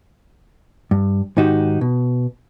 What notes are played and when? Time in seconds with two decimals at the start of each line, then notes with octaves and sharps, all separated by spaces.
0.91 G2
1.37 G#2 D#3 D#4 F#4 G4
1.81 B2